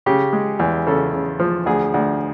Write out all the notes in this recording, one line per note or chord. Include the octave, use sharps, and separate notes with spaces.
C#3 G4
G#3
E2
C#3 A4
C#3
F3
D2 G#4
D2